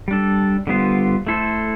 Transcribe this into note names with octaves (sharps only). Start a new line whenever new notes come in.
G3 D4 A4
D3 G3 B3 F4 C5
A3 E4 A4 C5